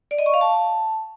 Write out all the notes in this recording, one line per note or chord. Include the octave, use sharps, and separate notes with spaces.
D5
D#5
C#6
F5
A5